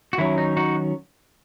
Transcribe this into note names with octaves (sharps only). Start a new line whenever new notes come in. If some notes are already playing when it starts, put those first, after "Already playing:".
F#4
D#3 F#3 C#4 E4
D#4
D#4 F#4